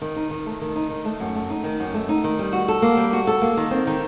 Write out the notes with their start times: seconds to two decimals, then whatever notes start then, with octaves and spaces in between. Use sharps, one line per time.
0.02 D#3
0.16 D#4
0.31 D#3
0.46 A3
0.61 D#3
0.76 D#4
0.90 D#3
1.05 A3
1.20 F#2
1.35 A3
1.50 D#4
1.64 D#3
1.80 F#2
1.94 A3
2.09 D#4
2.24 D#3
2.39 G3
2.53 F#4
2.68 A4
2.82 A#3
2.97 G3
3.13 F#4
3.27 A4
3.42 A#3
3.57 D#3
3.71 C4
3.87 D#3